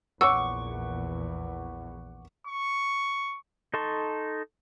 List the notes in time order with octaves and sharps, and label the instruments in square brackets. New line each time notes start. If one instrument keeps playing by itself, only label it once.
[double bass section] A#1 E2 A#2 [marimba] C#5 E6 [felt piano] F#5 D6 [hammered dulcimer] C#6
[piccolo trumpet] C#6
[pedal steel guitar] D#4 A4 A5 C6 C#6